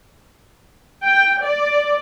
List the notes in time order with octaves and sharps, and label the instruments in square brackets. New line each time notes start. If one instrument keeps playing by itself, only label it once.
[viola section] G5
D5